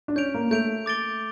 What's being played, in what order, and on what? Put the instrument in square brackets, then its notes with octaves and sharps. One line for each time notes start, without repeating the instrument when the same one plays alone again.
[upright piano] D4
[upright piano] C#4 [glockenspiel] G6 D7 F7
[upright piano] A#3
[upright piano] A3 [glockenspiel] G6 D7 F7
[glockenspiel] D6 A6 D7 G7